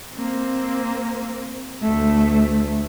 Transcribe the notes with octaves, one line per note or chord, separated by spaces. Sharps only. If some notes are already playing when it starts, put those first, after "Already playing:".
A#3 C4
D2 A3